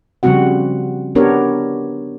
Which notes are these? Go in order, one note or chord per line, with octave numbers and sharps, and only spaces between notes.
C#3 F3 G3 C4 F#4 F#5
B3 D4 G4 A#4 C#5